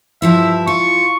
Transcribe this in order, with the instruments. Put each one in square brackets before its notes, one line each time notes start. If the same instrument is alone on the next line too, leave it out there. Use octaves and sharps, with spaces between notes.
[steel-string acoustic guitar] G2 F3 E4 [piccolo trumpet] E5
[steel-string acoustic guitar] F4 [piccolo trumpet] C#6